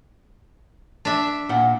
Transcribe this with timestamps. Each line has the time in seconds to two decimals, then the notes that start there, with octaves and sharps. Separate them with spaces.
1.05 D4 E5
1.49 A#2 F#5